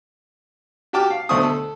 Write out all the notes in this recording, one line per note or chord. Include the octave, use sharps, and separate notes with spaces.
F#4 G4 G5 A5 D6 F6
F5
D2 B2 A3 C5 C#6 D#6
A4